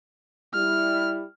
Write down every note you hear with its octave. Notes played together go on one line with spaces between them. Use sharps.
G3 E4 F6